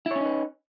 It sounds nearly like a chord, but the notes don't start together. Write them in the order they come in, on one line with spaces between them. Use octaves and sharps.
E4 C#5 C#4 D#4 B4